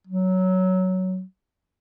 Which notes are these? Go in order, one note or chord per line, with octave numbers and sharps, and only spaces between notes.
F#3